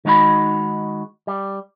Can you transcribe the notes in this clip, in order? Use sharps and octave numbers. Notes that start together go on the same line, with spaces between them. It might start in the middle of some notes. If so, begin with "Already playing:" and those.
D#3 G#3 D#4 F#4 B5
G3